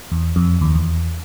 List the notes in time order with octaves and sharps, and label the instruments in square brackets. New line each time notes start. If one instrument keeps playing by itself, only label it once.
[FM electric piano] E2
F2
D#2
E2